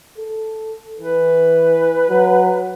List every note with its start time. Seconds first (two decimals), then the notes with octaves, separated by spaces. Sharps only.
0.18 A4
0.99 E3 B4
2.10 F#3